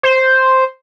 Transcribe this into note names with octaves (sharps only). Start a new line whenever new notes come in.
C5